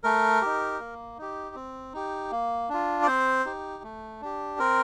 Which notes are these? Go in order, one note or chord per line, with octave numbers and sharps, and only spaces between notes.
A3 A#4
D#4 G4
A#3
D#4 G4
C4
D#4 G4
A#3
D4 F4
D5
C4 C5
D#4 G4
A3
D4 G4
C4 A#4